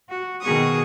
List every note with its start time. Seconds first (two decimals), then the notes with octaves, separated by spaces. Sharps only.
0.10 F#4
0.42 B2 D#3 F#4 G#4 C#6 D#6